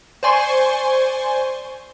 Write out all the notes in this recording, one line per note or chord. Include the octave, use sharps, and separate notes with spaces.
C5 D5 G#5 C6 C#6